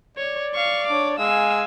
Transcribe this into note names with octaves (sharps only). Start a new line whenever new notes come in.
C#5 D5
F5 C#6
D4 C#5 D6
G#3 F5 G#5 E6